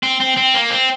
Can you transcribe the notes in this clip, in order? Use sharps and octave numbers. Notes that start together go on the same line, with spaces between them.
C4
C4
C4
A#3
C4